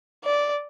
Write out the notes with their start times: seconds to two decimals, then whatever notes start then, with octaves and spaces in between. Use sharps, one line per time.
0.24 D5